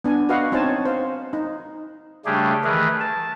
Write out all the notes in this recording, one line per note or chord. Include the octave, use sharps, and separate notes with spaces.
B3 D4 G#5
F#4 B4 D#5 F5 F#5
C4 D#4 C5 C#5 G#5 A5
C5 F5
D#4
C#3 G3 A3 D4 G4 G#4
D#3 E3 A3 G#4 A#4 B4
A5